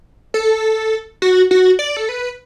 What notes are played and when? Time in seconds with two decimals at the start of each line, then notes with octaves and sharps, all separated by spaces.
0.34 A4
1.22 F#4
1.51 F#4
1.79 D5
1.97 A4
2.09 B4